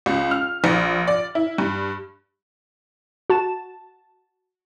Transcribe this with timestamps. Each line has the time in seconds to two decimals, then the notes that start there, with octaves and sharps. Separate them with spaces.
0.06 C#2
0.31 F6
0.64 A#1
1.08 D5
1.35 E4
1.58 G2
3.30 F#4 A5 E7